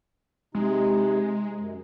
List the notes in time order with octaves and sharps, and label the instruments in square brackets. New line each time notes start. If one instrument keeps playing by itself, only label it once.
[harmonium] C3 D#4 [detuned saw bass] G#3
[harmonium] F#2